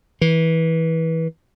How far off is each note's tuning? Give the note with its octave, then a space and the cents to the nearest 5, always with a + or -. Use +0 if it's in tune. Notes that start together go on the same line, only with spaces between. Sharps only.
E3 -20